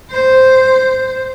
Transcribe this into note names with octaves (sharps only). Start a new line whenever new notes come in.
C5